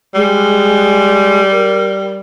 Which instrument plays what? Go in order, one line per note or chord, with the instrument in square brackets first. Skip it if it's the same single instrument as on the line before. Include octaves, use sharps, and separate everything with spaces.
[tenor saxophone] G3 [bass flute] G#3
[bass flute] A#4